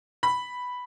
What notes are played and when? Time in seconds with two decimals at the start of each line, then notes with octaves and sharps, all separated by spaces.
0.23 B5